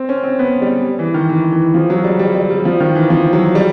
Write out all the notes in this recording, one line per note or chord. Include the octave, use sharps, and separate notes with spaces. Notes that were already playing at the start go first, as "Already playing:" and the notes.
Already playing: C4
C#4
C4
B3
G3
E3
D#3
E3
E3
F3
F#3
G3
G3
G3
G3
F3
D#3
E3
F3
F#3
G3